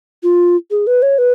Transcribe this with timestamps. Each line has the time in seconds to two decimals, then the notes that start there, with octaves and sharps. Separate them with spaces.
0.23 F4
0.71 G#4
0.87 B4
1.02 C#5
1.18 B4